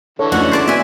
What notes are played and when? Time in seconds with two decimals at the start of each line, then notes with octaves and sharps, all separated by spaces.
0.19 D3 E3 A4 C#5
0.32 A3 C#4 D#4 F#4 F#5
0.52 C5 D5 A5
0.68 B3 E5 G#5